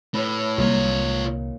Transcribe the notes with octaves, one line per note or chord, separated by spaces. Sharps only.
A2 B4 C#5
C2 A#2 D#3 A#3 F4 C#5